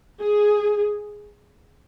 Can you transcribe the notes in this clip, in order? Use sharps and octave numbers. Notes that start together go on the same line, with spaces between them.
G#4